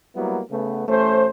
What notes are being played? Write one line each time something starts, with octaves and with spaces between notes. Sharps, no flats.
F#3 G3 A#3 B3 E4
C#3 A3 B3
A1 A3 C#4 C5